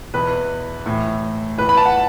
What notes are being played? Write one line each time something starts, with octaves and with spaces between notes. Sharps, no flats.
E2 B2 B4
A2 E3
E2 E3 B4
B5
A5
F#5